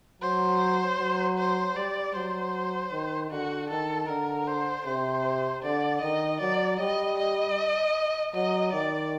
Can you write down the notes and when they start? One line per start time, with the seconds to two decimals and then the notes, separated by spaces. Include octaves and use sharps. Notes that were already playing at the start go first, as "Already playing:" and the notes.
0.22 F#3 C5
0.99 F#3
1.38 C5
1.76 G3 D5
2.15 F#3 C5
2.92 D#3
3.31 D3 F#4
3.70 D#3 A4
4.09 D3 A#4
4.47 C5
4.86 C3 C5
5.63 D3 D5
6.02 D#3 D#5
6.41 F#3 D5
6.80 G3 D#5
7.18 D#5
8.34 F#3 D#5
8.73 D#3 D5